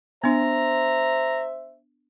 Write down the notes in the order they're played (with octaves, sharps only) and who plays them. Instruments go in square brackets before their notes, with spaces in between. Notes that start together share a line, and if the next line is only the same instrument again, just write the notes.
[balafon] B3 D4 [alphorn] C5 [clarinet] E5 [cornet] A#5